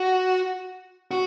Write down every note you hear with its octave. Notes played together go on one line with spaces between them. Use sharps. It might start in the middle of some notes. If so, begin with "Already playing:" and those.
Already playing: F#4
F#4